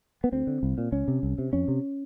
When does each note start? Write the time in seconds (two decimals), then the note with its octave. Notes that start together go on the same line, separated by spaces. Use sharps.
0.24 B3
0.32 D2 C4
0.47 D3
0.63 C2
0.78 A#2
0.92 C#2 C#4
1.08 C3
1.23 C2
1.38 C3
1.53 F2 C#4
1.68 C3